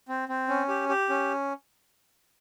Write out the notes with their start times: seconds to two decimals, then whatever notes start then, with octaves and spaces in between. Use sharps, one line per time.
0.09 C4
0.29 C4
0.49 C#4
0.68 G4
0.89 G4
1.09 C#4